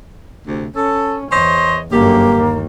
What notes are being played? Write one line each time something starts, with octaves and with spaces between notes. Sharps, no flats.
D2 C3
C#4 A4
E2 C5 C#5 D#5
G1 F#2 D3 A#3 G4
D#2